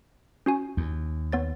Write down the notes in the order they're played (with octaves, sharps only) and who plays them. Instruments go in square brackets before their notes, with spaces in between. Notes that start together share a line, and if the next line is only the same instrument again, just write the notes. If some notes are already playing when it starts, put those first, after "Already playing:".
[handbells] C#4 F#4 G#5
[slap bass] D#2
[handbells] B3 C#5 A6